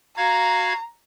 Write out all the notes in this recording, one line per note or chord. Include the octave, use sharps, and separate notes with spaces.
F#4 F5 A#5 G#6